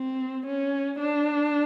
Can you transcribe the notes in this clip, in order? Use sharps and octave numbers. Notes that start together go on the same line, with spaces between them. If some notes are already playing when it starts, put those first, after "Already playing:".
Already playing: C4
C#4
D4